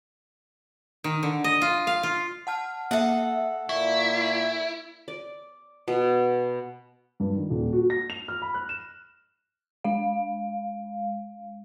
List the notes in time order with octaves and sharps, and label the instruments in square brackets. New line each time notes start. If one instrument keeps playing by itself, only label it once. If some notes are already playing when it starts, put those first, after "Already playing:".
[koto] D#3
D3
D#5
F4
F5
F4
[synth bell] F#5 A5 F6
[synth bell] A#3 E5 [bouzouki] A4 F#5
[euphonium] A#2 [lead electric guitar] E4 [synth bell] C#6
[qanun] D5
B2
[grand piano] G2
D#3
D#1
F#4
A#6
F7
F6
B5
F#6
E7
[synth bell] G#3 F5